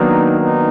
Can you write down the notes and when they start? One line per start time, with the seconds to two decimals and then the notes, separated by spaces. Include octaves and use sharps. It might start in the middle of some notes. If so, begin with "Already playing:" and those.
Already playing: D#3 F#3 A#3 B3 D4 D#4
0.39 B3 D#4